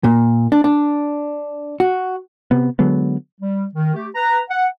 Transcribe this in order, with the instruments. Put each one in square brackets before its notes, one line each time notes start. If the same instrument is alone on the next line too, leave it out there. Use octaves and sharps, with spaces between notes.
[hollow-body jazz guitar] A#2
D4
D4
F#4
[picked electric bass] C3 B3
D3 F#3 G#3 B3
[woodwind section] G3
D#3
A3 G4
B4 A#5
F#5